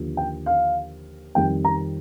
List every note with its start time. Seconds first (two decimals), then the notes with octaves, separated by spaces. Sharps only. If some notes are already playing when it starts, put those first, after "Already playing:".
Already playing: D#2 D3 F3
0.17 G5
0.46 F5
1.35 F2 D#3 G3 G5
1.65 A#5